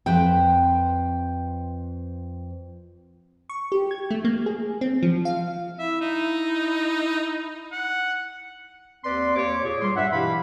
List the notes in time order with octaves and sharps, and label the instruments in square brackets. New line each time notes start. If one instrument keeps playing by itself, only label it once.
[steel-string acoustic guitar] F2 B4 C5 G5
[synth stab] C#6
G4
G#6
A3
A#3
G#4
C4
F3
F5
[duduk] E4 [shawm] E5
[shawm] D#4
F#5
[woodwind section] D#2 C4 B4 D5 C6
D#2 C#5 D6
A#2 G#4 C#5
G3 C6
G2 E5 F#5
B2 E3 E4 G4 F5 B5